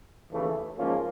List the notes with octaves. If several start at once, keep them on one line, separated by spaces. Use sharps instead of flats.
D#2 C#3 E3 A3
G#2 F3 A#3 C#4 F4